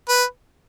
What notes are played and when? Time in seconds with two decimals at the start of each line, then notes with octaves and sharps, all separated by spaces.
0.08 B4